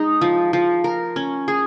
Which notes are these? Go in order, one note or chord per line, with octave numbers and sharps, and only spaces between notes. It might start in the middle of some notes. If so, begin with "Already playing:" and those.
Already playing: G#3 D#4
F3
F3
A#4
C#4
G#4